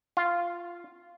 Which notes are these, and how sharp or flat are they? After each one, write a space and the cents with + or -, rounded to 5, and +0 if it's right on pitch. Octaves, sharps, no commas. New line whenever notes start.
F4 -10